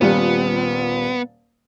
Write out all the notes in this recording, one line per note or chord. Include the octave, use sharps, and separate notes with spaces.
D#1 A#2 G3 B3